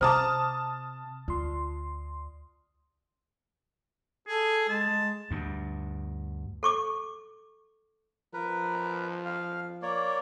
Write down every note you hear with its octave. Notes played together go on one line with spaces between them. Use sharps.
C3 C5 A5 A#5 D6 D#6 F6
D2 F4 C6
G#4 A4
G#3 A5
G#3
D2 G2
A4 C#6 D6
F3 A#4 B4
F5
A#3 C#5 D5